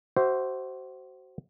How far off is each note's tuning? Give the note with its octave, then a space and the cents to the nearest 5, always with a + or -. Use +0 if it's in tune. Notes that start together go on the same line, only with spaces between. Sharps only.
F#4 +30 C5 +0 E5 +0